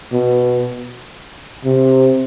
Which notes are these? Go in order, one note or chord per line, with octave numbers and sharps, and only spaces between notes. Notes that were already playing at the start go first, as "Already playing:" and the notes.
B2
C3